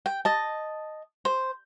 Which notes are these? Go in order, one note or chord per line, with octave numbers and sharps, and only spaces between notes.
G5
D#5 A5
C5